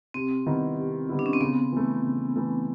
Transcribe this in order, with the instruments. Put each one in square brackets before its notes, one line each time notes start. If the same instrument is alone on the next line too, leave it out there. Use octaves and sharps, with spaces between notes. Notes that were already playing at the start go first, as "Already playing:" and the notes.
[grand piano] C3 [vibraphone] C4
[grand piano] D#3 G3 B3 E4
C3
D#3 G3 B3 E4
[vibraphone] D4
C#4
C4
[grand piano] C#3 [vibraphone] B3
[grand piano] E3 A3
C#3
E3 A3